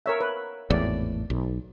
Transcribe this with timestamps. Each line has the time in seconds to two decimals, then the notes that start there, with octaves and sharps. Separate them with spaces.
0.06 A#4 C#5 E5
0.21 B4
0.70 G#1 E2 A2 D5
1.30 B1